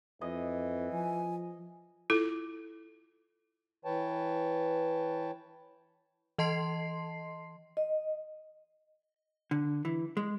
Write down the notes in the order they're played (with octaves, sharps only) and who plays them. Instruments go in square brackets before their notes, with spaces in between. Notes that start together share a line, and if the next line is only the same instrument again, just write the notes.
[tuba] F2 [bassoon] E3 [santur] D#5
[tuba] F3 [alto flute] G#5
[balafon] E4 F4 A4
[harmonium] E3 B4 C#5 G5 A5
[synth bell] E3 D#5 A5 C6 C7
[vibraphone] D#5
[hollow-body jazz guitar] D3
E3
G#3